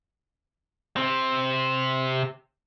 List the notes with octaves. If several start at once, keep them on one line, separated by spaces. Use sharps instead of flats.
C3 C4